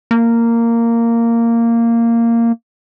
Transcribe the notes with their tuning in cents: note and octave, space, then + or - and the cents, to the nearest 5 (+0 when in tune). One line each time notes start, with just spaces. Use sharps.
A#3 -10